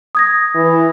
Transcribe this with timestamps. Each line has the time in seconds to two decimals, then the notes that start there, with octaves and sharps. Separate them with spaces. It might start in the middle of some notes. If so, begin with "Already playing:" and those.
0.15 D#6 G#6 A#6
0.55 E3